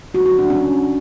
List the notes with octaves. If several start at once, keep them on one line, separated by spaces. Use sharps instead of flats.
D3 F#4
F#4
D3 D4
C#4
D3